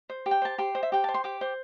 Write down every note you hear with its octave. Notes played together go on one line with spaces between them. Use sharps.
C5
G4
G5
C5 A5
G4 C6
C5
E5
G4 G5
C5 A5
C6
G4 D6
C5